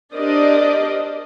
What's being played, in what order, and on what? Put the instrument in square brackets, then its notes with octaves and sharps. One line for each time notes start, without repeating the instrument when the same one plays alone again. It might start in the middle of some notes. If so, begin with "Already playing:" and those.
[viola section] D4 G4 A#4 C5 D5 D#5